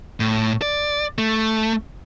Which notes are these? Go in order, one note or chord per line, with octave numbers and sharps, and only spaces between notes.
A2
D5
A3